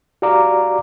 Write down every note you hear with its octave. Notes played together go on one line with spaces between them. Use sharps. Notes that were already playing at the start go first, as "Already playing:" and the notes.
F#4 G4 D5 F5 A#5 D6